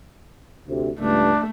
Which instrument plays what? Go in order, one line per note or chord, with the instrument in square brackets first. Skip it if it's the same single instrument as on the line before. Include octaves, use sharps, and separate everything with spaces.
[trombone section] D2 C3
[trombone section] C#2 G2 [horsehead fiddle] A3 [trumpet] D4